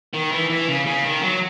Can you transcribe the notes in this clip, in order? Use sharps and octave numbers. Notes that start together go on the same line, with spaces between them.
D#3
E3
E3
C#3
C#3
D#3
F#3